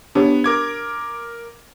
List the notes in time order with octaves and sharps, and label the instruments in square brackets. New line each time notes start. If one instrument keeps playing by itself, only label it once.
[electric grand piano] B3 [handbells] D4 G4 C#5
[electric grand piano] A#4 D6 G#6